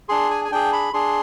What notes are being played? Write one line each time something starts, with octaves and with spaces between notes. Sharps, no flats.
D4 G#4 C6
G#5
G#5
D4 G#4 G5
B5
D4 G#4 C6